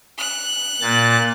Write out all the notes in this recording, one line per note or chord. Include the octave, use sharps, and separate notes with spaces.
F#6
A#2 A6